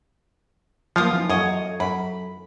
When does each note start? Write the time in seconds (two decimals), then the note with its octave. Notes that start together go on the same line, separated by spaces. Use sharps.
0.96 F3 F#3 A#3 F4 F5 D#6
1.12 E3 C#4 D#4
1.30 F#2 F#3 F4 A4 C#5 D#5 D#6
1.80 F#2 B5